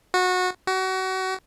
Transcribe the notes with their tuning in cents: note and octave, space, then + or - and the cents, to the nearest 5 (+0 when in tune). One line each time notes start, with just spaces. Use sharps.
F#4 -20
F#4 +30